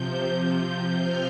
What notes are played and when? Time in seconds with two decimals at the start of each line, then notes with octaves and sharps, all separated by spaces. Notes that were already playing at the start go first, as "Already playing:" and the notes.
Already playing: C3 F3 G6
0.99 F6